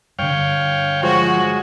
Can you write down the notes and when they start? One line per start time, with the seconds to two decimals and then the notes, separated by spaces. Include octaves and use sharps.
0.19 G2 D3 C#5 F5 G5
1.03 F3 G#3 F#4